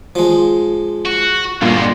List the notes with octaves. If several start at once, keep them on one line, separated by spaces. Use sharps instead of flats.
F3 G#3
F#4
G2 A#2 D3 G#3 F4